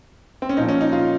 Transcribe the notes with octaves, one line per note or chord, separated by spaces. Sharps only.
C4
C#4
A#2 F3 D#4
C#4
D#4
F4